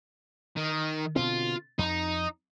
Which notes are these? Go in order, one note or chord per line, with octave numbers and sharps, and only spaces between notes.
D#3
B2 D3 C4 F4
F2 D#4